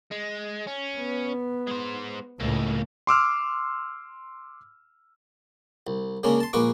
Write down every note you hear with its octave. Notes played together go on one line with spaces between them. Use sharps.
G#3
C#4
B3
G#3 C5
C#2 A2 A3 A#3
C6 D6 E6 F6
C2
C#3 G#3 A#3 C#4 D4
A5 C6
A#1 G#3 A#3 B4 C#6 D6